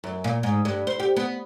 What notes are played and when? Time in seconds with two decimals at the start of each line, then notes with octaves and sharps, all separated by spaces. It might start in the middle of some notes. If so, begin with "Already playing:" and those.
0.04 F#2
0.24 A#2
0.43 G#2
0.65 G2
0.87 C5
1.00 G4
1.16 B3